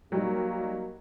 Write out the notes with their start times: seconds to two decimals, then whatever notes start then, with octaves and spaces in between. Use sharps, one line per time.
0.12 F#3 G3 A#3 D#4 F#4